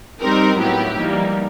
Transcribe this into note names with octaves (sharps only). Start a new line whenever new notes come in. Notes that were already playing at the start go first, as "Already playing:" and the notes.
G3 C4 D#4 G4 A#4
A2 F#3 B3 E4 G4
E3 G3 A#3 D#4